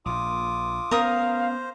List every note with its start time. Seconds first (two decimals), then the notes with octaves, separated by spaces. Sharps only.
0.06 A#1 A#2 F4 D6 D#6
0.91 B3 C#4 A#4 C5 F5 D#6